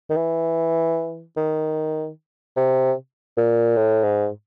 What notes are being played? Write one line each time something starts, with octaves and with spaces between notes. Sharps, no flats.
D#3
E3
D#3
C3
A#2
A2
G#2